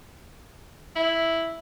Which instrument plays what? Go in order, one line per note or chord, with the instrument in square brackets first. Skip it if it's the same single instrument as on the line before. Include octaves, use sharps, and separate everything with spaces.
[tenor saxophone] E4